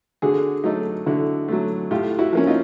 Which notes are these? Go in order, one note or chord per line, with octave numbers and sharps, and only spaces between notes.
D3 F#4 G#4
F#3 A3 D#4
D3 E4 F#4
F#3 A3
A2 F4 G4
E4 F#4
F3 A#3 C#4
D#4 F4